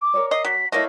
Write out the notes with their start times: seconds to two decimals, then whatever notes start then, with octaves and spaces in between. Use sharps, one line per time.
0.02 D6
0.14 A#4 C#5 D5
0.31 D#5 C7
0.45 F#3 B6
0.72 A3 A#3 E4 C#5 D#5 F5 A#6